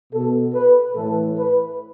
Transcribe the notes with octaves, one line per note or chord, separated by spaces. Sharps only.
B2 A4
B4
A2 E3 A4
B4